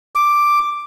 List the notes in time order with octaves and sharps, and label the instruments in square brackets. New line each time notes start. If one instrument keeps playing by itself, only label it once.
[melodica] D6